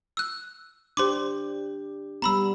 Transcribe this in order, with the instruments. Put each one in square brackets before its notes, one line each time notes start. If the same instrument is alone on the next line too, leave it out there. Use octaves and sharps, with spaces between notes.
[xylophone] E6 F#6
[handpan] D4 G4 [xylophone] C5 C6 D6
[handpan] G3 B3 [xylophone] A#5 B5 E6